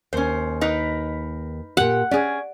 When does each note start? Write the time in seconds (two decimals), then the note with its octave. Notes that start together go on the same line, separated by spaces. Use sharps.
0.13 D#2 C#4 C5
0.61 D#4 A#4 B4
1.77 A#2 G4 F#5
2.11 C#4 G#4 D5